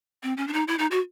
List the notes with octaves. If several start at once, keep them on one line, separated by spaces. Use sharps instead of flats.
C4
C#4
D4
D#4
E4
D#4
F#4